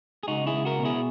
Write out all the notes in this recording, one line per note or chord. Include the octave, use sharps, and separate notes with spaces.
G#4
C#2 D#4 F#4
E4 G#4
C#2
F#4 A#4
B2
E4 G#4